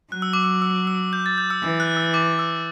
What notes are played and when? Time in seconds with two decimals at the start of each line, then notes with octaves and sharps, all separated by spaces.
0.11 F#3 F#6
0.22 E6
0.33 D6
0.44 E6
0.62 E6
0.87 E6
1.13 G6
1.26 A6
1.38 G6
1.50 E6
1.63 E3 E6
1.80 F#6
1.97 E6
2.14 D6
2.39 E6